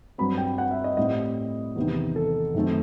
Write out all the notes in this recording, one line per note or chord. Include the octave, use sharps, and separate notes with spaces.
G2 F#3 C4 B5
G5
F#5
E5
D#5
A2 G3 C4 D#5
E2 C3 D#3
A4
F#2 D#3 A3 C4